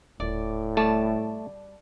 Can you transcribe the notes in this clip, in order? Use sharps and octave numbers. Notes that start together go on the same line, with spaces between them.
D#1 A2 D5
G3 A3 D5 A5